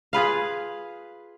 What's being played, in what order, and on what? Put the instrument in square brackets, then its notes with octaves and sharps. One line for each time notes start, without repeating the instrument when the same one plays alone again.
[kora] F4 G#4 B4 F5